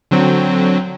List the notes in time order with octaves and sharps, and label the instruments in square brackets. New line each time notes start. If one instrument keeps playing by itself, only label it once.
[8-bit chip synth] D3 F#3 C4